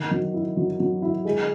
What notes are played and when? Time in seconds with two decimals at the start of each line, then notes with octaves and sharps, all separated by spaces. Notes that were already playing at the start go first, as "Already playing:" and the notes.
Already playing: D#3
0.11 F#3
0.34 E4
0.57 F#3
0.80 F#3
1.02 E4
1.25 G#3